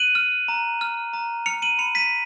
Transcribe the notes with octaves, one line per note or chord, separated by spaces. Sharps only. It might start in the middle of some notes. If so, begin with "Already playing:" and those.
Already playing: F#6 D#7 F#7
F6
A#5
F6
A#5
F6 C#7 F7
D#7 F#7
B5 C#7 F7
B6 D#7